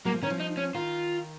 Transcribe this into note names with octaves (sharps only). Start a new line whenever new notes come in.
F#3 A#3
F3
D#3 C#4
F3
D#4
C#4
D#3 F4